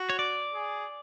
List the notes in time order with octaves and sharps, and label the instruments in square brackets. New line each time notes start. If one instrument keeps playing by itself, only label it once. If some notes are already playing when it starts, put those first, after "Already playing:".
Already playing: [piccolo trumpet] F#4
[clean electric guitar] C#5
D5
[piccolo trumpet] G#4